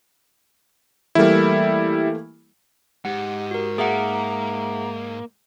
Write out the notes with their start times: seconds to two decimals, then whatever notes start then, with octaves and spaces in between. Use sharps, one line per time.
1.15 E3 G3 A3 A#3 E4
3.05 G#2 G4 F#5
3.51 F#4 A#4
3.78 A#3 G#4 E5 F#5 A#5